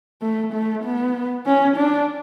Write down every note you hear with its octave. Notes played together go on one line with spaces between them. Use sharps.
A3
A3
B3
C#4
D4